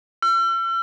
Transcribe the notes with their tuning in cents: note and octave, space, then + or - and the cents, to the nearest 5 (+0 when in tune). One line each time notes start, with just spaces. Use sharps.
E6 +45